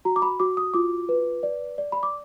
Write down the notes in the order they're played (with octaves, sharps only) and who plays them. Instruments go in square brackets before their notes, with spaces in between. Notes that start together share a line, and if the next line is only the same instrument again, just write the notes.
[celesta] F#4 A#5
D6
B5
F#4 D6
D#6
F4 D6
B4
D5
D5
B5
D6